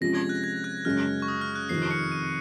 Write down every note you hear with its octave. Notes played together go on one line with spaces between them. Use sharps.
C3 F3 G#3 C#4 F4 A#6
G#6
F#6
G#6
F#6
F#2 C#3 G#3 C#4 F6
C#6
D#6
F6
F#6
F2 C3 D#3 C7
C#7
D#7